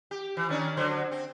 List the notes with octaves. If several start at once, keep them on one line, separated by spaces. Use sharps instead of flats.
G4
E3
D#3 C#4 D4
D3 F#3 C5
C4